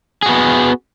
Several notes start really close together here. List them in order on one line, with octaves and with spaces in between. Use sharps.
G#4 F#4 B3